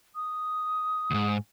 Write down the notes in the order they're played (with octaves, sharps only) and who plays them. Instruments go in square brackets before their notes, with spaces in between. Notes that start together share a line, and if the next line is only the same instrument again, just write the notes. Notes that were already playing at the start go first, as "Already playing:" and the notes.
[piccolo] D#6
[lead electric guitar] D2 G#2